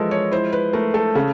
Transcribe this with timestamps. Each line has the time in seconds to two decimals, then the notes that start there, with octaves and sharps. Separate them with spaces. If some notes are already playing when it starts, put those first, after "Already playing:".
Already playing: E3 F3 G#3 A4 A#4
0.11 C#5
0.31 E4 C5
0.53 B4
0.73 A3 A#4
0.94 A4
1.15 C#3 A4